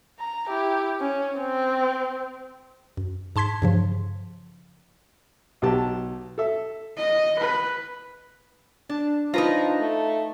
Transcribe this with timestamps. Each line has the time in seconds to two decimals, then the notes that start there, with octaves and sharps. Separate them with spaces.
0.19 A#5
0.48 E4 G4
1.00 C#4
1.38 C4
2.97 F#2
3.36 G#2 A5 C6 G#6 B6
3.62 G2 C#3 F3
5.62 B1 G4 A5
6.38 A4 E5
6.97 D#5
7.39 B4
8.89 D4 A5
9.34 F3 D#4 F4 B4 A#5
9.80 A3